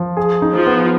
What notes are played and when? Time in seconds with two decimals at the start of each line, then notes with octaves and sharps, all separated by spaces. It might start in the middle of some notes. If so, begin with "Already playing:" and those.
Already playing: F3
0.17 G#4
0.42 D#4
0.54 F3
0.67 B3